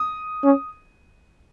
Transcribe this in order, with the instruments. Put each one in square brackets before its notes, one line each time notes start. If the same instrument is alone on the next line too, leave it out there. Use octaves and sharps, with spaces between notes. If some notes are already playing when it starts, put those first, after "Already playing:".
Already playing: [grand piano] D#6
[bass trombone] C#4